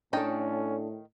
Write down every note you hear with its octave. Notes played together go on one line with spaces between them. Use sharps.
A2 D#3 C#4 D4 A4 D#5 G5